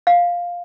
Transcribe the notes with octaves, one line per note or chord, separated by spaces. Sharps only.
F5